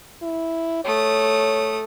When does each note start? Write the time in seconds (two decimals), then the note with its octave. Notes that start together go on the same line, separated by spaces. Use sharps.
0.22 E4
0.85 A3 C#5 D#6